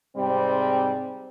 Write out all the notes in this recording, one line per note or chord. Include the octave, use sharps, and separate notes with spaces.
G#2 C3 G3 C4